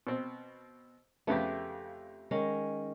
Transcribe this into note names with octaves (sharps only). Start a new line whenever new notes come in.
B2 C4
F2 C#3 A3 B3 G4
D#3 G#3 C#4